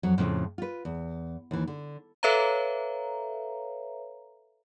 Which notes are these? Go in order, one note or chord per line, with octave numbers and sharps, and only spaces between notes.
F2 F#3
F2 A2 C#3
F4 B4
E2
D#2 E3
D3
A4 B4 C#5 E5 F5 A#5